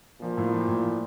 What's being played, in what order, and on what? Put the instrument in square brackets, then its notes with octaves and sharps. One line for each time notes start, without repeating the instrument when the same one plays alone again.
[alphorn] A#2 [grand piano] F3
[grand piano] A2
F3
A2
F3